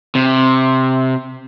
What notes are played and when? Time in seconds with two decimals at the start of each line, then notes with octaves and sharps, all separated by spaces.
0.15 C3